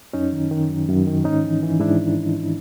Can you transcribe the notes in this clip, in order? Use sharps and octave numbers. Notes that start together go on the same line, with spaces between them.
F#2 C#4 D#4
D#3
D#3
F#2
F#2
D#3
G#2 C#4 D#4
E3
E3
G#2 D4 E4